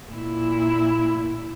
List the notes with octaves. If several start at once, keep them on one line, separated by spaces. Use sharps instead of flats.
A#2 E4